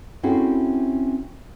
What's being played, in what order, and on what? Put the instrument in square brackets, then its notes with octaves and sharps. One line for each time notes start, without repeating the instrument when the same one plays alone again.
[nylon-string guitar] C4 C#4 E4 F#4 G#4 A4